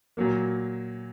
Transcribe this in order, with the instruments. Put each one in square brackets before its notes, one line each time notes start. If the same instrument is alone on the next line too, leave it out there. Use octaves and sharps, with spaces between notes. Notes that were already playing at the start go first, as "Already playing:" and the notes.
[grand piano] A#2 F#3 A#3